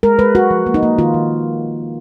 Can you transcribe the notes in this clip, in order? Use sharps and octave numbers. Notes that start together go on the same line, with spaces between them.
G#3 A#4
G#3 B4
G#3 F#4
F3
A#3
D#4
A#3
D#3 F4
D#3